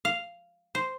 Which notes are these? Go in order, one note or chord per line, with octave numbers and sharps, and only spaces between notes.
F5
C5